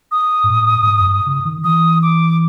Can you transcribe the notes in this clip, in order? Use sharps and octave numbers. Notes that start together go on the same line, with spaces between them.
D#6
G#2
A2
A2
G#2
F#2
G2
C#3
D#3
E3 D#6
D6